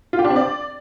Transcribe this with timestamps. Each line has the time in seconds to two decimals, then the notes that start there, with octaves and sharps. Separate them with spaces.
0.13 F4
0.19 G4
0.25 D4
0.30 C4
0.36 D5